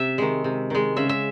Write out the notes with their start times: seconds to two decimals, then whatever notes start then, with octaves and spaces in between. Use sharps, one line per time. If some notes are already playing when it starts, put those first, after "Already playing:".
Already playing: C3 E5
0.18 D#3 G#3
0.44 C3
0.70 D#3 G#3
0.97 C#3 E5
1.09 E5